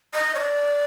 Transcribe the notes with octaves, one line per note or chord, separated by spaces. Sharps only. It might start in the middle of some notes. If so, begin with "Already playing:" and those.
D#5
C#5
D5